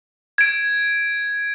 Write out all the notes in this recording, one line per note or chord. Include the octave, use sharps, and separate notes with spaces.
G#6 D7